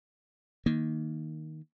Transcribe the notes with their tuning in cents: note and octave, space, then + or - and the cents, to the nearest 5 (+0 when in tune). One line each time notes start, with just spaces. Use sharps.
D#3 +0 A#3 +0